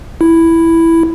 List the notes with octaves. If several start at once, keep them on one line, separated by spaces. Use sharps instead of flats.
E4